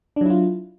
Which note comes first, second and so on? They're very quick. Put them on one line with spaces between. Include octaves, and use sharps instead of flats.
D4 F#3 E4 F4